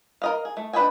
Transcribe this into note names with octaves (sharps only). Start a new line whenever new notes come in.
A#4 D#5 F5
G#4
A3
D4 B4 D#5 G5 G#5